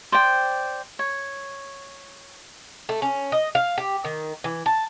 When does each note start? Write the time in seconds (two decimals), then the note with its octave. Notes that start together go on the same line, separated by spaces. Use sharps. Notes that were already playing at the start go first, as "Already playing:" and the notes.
0.12 C5 D5 G5
0.99 C#5
2.89 A3
3.02 C#4
3.32 D#5
3.55 F5
3.78 G4
4.05 D#3
4.44 E3
4.66 A5